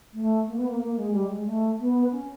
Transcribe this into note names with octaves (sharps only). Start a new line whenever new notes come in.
A3
A#3
B3
A#3
A#3
G#3
G3
G#3
A3
B3
C#4